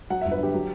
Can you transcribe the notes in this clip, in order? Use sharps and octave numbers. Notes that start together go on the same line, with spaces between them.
F#3 F#5
G1 E5
B4
D3 G4
F#3